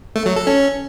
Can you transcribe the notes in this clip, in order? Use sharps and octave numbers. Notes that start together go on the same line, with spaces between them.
A3
F#3
A4
C#4